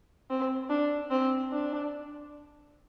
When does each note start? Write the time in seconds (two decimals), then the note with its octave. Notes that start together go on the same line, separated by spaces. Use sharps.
0.30 C4
0.70 D4
1.11 C4
1.52 D4